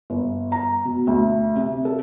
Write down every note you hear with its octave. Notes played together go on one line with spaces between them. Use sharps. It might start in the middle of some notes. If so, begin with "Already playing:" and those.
G1
A#5
B2
D2
C3
A4